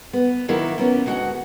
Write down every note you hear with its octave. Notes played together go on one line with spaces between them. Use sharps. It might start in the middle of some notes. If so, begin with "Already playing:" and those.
B3
D#3 F#3 A#3 E4
A#3 B3 C#4
D2 G#3 F#4 F#5